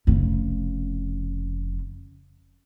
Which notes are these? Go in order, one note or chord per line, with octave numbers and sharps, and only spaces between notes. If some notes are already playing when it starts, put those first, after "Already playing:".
F1 C#3